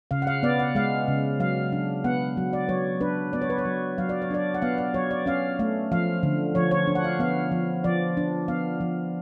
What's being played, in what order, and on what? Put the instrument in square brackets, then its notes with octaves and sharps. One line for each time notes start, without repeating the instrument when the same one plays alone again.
[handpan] C#3 F5
F#5
F5
B3 D5
F#5
G#3 F5
C#3
F#3 F5
D4
B3 F#5
F#3
D5
F#3 C#5
D4 B4
B3 D5
C#5
B4
C#5
F#3
F#3 F5
D5
C#5
D4 D5
F#5
B3 F5
D5
F#3 C#5
D5
C#4 F5
A3 F5
F3 F5
D3
F3 C#5
C#5
D4
F#5
F5
B3 F5
F3
F3 D5
D4
B3 F5
F3